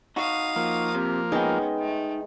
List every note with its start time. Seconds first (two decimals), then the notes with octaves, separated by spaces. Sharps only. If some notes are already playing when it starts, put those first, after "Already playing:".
0.16 D#4 F#4 F5 D#6
0.56 F3 A#3
0.95 C3
1.32 G#3 B3 C#4 D#4 G5
1.79 A3